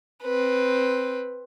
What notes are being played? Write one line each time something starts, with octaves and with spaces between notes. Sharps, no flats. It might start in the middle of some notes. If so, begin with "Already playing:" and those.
C4 B4